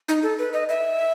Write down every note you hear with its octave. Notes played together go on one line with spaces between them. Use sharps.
D#4
A4
B4
D#5
E5